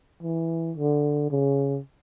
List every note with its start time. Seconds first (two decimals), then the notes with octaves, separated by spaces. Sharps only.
0.23 E3
0.77 D3
1.30 C#3